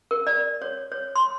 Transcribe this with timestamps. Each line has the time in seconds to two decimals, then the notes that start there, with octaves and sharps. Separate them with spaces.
0.11 A#4
0.27 D5
0.62 C#5
0.92 C#5
1.16 C6